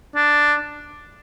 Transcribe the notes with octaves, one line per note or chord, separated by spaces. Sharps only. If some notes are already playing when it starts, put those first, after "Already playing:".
D4